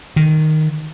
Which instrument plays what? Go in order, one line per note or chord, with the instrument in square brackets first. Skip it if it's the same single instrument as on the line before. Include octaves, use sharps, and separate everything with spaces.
[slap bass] D#3